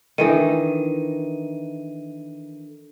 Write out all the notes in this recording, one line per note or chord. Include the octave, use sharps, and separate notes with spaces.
D#3 E3 D4 D#4 A4 D#7